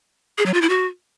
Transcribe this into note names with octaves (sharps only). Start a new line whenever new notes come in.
G#4
F#3
F4
E4
F#4